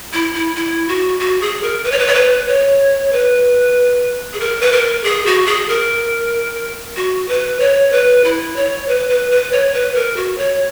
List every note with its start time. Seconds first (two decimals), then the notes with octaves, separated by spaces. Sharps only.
0.13 E4
0.34 E4
0.56 E4
0.88 F#4
1.20 F#4
1.41 G#4
1.62 A#4
1.84 B4
1.92 C#5
1.99 B4
2.07 C#5
2.15 B4
2.48 C#5
3.12 B4
4.33 G#4
4.40 A#4
4.61 B4
4.72 A#4
5.04 G#4
5.26 F#4
5.46 G#4
5.69 A#4
6.96 F#4
7.29 B4
7.60 C#5
7.92 B4
8.24 E4
8.56 C#5
8.88 B4
9.10 B4
9.31 B4
9.52 C#5
9.74 B4
9.95 A#4
10.16 F#4
10.38 C#5